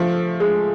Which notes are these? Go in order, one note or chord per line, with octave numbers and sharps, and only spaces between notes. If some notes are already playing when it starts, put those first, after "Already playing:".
Already playing: F3 A3
G#3